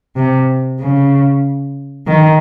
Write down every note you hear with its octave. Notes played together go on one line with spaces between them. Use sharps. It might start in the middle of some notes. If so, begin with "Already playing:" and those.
C3
C#3
D#3